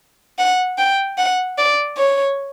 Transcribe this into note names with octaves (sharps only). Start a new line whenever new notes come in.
F#5
G5
F#5
D5
C#5